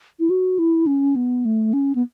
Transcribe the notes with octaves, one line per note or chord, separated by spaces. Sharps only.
E4
F#4
E4
C#4
B3
A3
C#4
B3